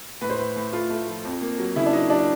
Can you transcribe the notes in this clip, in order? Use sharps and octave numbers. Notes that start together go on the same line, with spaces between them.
A2 B4
C5
A2 B4
A2
A3 F4
A3
F3
F2
A#3
F#3
C#3 E4
D4
F#3 D#4
F#3 D4